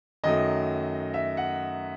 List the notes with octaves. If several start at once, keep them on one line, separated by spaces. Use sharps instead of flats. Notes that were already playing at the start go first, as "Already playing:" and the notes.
F#2 D#3 F#3 A3 D#5
E5
F#5